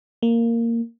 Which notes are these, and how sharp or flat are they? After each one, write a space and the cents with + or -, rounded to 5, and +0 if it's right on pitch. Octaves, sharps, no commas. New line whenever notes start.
A#3 -10